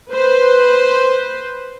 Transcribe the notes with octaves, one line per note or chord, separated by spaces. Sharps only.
B4 C5